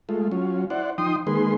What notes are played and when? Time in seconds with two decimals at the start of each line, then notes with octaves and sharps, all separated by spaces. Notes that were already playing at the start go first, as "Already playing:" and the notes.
0.09 G#3 A3 F4
0.32 F#3 C#4 F4
0.70 E4 C5 D5 F#5
0.98 F3 D#4 G5 C6 D#6
1.27 D#3 G#3 A#3 G#4 B4 C6